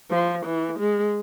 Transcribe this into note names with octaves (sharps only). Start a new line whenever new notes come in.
F3
E3
G#3